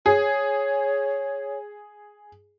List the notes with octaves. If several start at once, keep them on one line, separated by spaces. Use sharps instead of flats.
G#4 C#5